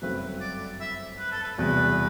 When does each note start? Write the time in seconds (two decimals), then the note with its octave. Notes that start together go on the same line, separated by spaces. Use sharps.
0.02 G1 F#2 F#3 A3 C4 B4
0.41 D5
0.81 E5
1.19 B4
1.32 A4
1.43 B4
1.58 E1 E2 C3 G3 B4